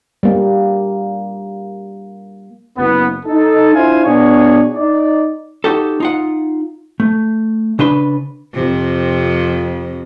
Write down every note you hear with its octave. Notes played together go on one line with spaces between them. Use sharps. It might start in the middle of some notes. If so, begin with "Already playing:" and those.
G3 A#3
F#1 B3
D#4 A4
D4 E4 F4 C5 F5 G#5
B2 B3 D4 F#4 G#4 C#5
D#4 D5
D#4 F#4 G4 A4
D#4 F4 F#5
A3
C#3 D4 B4 C6
F2 C3